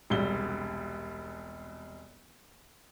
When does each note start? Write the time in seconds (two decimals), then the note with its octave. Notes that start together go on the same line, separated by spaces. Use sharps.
0.10 E1 C2 G3 G7